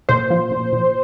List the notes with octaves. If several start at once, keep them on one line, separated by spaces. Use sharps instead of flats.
A#2 C5
F3
A#2
A#2